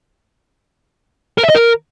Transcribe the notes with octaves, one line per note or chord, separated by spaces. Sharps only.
A#4
E5
D#5
A#4